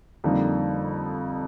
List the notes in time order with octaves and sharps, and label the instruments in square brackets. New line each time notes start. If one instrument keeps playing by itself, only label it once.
[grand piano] F2 D3 G3 A#3 D#4